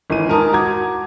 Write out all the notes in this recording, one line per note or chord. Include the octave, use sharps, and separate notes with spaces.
G#1 E3 D#7
G#2 A#4 G#5 A5 D#6
F#4 A#5 D6 G#6